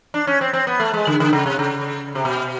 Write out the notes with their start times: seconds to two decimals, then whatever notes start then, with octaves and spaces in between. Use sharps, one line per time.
0.14 D4
0.27 C#4
0.41 C4
0.53 C4
0.67 B3
0.80 A3
0.93 G#3
1.07 D3
1.20 D3
1.33 C#3
1.46 C3
1.59 C#3
2.15 C3
2.25 B2